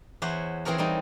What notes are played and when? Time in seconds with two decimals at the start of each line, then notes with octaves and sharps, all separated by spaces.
0.22 E2 E4 C5 C#5 F#5
0.65 E3 C4 G#4 A#4 C#5
0.78 E3 G3 D#4